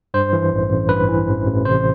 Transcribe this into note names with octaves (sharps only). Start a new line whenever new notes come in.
G2 C5
E3
A1
A1
G2 B4
E3
A1
A1
C3 C5